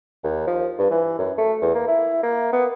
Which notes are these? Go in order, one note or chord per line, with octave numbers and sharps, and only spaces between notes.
D#2
F3
G2
E3
F#2
A3
E2
A#3
E4
A#3
B3